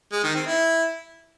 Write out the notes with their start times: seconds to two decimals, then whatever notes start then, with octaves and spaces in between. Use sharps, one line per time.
0.13 G#3
0.24 D#3
0.35 C4
0.47 E4